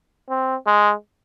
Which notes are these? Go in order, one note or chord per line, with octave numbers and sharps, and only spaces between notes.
C4
G#3